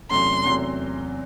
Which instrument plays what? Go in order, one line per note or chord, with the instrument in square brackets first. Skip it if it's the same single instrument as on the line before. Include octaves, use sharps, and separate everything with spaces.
[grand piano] E2 C3 F#3 A3 C#4 [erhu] C6
[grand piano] E2 C3 F#3 A3 C#4